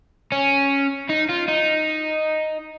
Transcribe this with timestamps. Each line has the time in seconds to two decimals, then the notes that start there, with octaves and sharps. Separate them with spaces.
0.32 C#4
1.09 D#4
1.29 F4
1.48 D#4